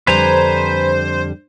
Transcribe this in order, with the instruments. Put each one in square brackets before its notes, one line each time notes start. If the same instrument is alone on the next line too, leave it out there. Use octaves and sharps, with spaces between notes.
[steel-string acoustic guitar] F2 D3 G3 [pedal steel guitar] B4 G#5 A#5 [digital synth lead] C5